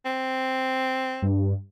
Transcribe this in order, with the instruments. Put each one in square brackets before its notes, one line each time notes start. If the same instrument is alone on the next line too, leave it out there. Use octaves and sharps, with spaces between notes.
[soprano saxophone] C4
[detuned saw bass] G2